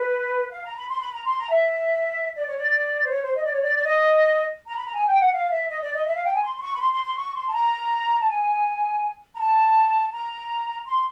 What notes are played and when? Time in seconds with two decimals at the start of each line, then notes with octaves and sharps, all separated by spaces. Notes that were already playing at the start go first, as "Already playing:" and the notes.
Already playing: B4
0.51 F5
0.64 A#5
0.76 B5
0.89 C6
1.00 B5
1.12 A#5
1.25 C6
1.38 A#5
1.50 E5
2.36 D5
2.46 C#5
2.57 D5
3.04 C5
3.10 C#5
3.23 C5
3.35 D#5
3.43 D5
3.53 C#5
3.61 D5
3.76 D5
3.84 D#5
4.67 A#5
4.76 B5
4.85 A#5
4.94 G#5
5.07 G5
5.19 F#5
5.32 F5
5.50 E5
5.69 D#5
5.81 D5
5.93 D#5
6.06 E5
6.15 F5
6.24 G5
6.34 G#5
6.43 C6
6.56 C6
6.61 C#6
6.75 B5
6.80 C6
6.92 C6
7.04 C6
7.17 C#6
7.35 C6
7.48 A5
7.53 A#5
8.21 A5
8.28 G#5
9.35 A#5
9.39 A5
10.12 A#5
10.86 C6